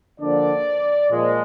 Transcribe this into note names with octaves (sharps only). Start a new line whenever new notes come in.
D3 F3 A#3 D4 D5
A#2 F3 G#3